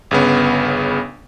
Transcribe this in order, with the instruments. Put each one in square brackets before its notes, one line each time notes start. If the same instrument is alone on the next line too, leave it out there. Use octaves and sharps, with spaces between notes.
[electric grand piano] G1 C#3 B3